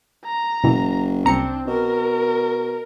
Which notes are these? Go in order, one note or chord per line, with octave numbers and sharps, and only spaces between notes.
A#5
F#1 B2 E3
C2 C4 D4 A#5 C#7
B2 A#4